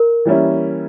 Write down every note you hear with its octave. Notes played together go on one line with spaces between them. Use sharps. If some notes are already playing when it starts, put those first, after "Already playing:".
Already playing: A#4
E3 G3 A#3 C#4 E4